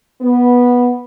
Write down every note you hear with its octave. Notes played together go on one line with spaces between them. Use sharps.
B3